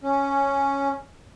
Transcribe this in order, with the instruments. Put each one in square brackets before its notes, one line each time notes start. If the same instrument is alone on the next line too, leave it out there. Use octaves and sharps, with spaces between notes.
[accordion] C#4